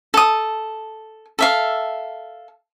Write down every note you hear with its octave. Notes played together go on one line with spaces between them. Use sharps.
A4 D#6
A4 E5 F5